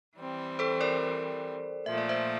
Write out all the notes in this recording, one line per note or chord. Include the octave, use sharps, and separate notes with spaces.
E3 G3 C4
A4 C5
A#4 D5
A#2 F3 A3 E5
D5
C5 E5